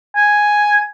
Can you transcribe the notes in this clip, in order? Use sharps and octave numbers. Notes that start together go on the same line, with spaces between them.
G#5